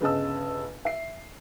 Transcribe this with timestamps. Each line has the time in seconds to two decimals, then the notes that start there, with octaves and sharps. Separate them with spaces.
0.01 G1 C#3 D#5 A5 E6
0.85 E5 C7